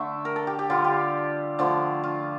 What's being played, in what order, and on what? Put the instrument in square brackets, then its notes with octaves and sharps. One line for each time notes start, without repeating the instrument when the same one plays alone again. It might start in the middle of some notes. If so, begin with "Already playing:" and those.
Already playing: [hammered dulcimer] D3 A3 E5
A#4
A4
G4
G4
D3 G3 F4
G4
D3 F3 A3
F4